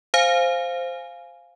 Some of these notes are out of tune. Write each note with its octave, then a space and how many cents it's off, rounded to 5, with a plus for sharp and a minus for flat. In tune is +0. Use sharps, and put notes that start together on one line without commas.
C5 +0 F5 +0 G#5 +0